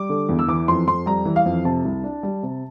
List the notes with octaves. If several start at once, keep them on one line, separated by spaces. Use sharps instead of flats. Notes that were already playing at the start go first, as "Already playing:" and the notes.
Already playing: G3 D6
D3
E2
E6
E3 D6
F2 C6
F2 C6
G3 A#5
E3
F5
F2
C3 A5
C2
D4
G3
C3